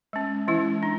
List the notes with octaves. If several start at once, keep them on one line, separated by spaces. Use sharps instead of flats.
G#3 C#4
E3 G#3 C#4 E4
D4